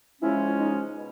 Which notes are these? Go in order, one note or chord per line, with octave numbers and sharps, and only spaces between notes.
C#3 F3 G#3 C#4 E4
D#4
B2